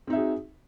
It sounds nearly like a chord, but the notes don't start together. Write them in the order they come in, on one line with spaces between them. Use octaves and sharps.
C4 D#4 E5 G#4 F#4